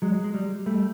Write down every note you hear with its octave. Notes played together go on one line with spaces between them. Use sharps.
F#3 G#3
G#3
G3
G3 A3